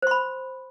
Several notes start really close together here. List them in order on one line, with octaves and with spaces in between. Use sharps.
C5 C6 B5